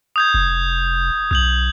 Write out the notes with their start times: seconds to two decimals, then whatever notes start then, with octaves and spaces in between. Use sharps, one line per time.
0.16 D#6 G6 G#6
0.34 F1
1.31 B1 D#6 G6 F#7